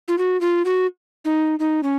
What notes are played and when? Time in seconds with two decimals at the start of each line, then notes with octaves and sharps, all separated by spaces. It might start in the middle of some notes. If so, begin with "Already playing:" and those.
0.08 F4
0.18 F#4
0.41 F4
0.65 F#4
1.25 D#4
1.59 D#4
1.83 C#4